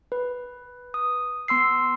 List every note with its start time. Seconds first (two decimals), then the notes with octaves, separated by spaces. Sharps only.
0.12 B4
0.94 D#6
1.48 B3 C6 E6 C7